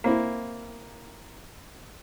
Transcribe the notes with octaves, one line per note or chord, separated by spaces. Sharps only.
A#3 C4 E4